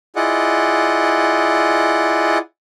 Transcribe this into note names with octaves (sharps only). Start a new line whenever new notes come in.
E4 F4 G#4 D5 D#5 F#5